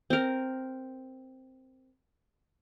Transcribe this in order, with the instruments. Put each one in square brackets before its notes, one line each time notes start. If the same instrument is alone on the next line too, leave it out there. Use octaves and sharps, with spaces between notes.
[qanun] C4 A#4